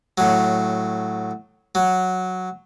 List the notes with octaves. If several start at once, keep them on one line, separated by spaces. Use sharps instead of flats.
A2 F#3
F#3